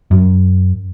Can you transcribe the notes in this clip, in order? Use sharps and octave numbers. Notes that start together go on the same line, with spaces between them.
F#2